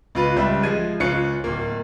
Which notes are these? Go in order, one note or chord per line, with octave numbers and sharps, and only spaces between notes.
C#2 F4 B4
C#2 G3 E5
F3 G#3 G#6 D#7
C#2 C#4 F4 F#6 C#7
D1 A#3